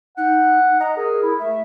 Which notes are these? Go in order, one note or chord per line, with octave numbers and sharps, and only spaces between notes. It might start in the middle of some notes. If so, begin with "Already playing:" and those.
D#4 F#5
D#5 A#5
G#4 A#4
E4
A3 E5